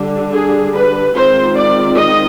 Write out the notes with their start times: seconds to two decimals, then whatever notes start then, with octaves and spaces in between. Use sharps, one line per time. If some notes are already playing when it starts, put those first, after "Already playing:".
Already playing: D3 G3 D4
0.33 G#4
0.74 B4
1.14 D#3 G#3 C4 F4 C5
1.55 D5
1.96 D#5